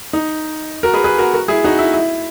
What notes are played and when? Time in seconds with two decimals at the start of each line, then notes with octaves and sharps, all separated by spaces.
0.13 D#4
0.83 F#4 A#4
0.94 G#4 B4
1.04 G#4 B4
1.18 F#4 A#4
1.34 F#4 A#4
1.48 E4 G#4
1.64 D#4 F#4
1.79 E4
1.94 E4